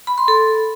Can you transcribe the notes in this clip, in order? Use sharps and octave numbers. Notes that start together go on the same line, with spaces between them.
B5
C6
A4